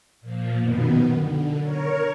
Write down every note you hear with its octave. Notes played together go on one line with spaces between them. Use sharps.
A#2 F3
F#2 B2 D#3 B3
D3
A#4 C#5